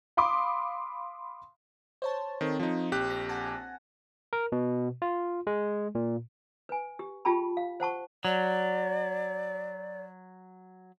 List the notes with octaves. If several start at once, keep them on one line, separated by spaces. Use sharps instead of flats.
F5 B5 C6 D6 D#6
C5 C#5 A5
D#3 C4 A4
F3 D#4
A#1 G4 F#6
A#6
F#5 G#5 A5
A#4
B2
F4
G#3
A#2
B4 G#5
G4
F4 G4 G#4 G5 A5 B5
F5
C5 F#5 A5 C#6
F#3 D5